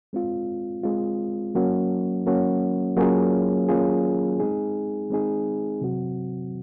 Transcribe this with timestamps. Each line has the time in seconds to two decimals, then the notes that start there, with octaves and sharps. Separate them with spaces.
0.13 G#3 C4 F4
0.83 G#3 C4 F4
1.55 F#3 A#3 C#4 F#4
2.26 F#3 A#3 C#4 F#4
2.97 F#3 A#3 C#4 F4 G#4
3.69 F#3 A#3 C#4 F4 G#4
4.40 G#3 C4 D#4 G#4
5.10 G#3 C4 D#4 G#4
5.81 C3 F#3 C4 F#4